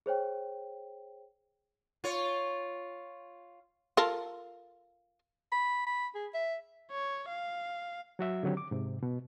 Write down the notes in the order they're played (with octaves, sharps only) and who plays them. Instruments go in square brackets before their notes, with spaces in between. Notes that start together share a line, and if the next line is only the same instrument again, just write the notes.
[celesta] G#4 C5 C#5 G5
[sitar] F4 C#5
[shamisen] F4 A4 A#4
[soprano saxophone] B5
B5
G#4
E5
[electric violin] C#5
F5
[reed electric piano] F#3 F#4 E5
D3 D#3 F#3 C4 G4
D6
G#2 C3
B2